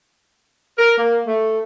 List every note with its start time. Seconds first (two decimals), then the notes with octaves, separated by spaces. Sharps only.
0.78 A#4
0.97 A#3
1.26 A3